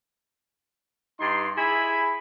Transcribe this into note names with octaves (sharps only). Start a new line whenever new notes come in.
G2 D#4 C6
E4 G#4 G#5 B5